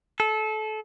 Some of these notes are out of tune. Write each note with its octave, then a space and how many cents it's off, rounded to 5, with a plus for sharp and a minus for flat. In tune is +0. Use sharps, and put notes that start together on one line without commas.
A4 -25